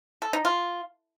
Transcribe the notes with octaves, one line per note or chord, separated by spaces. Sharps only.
A4
D#4
F4